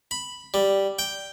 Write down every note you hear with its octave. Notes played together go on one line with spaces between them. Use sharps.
B5
G3
G5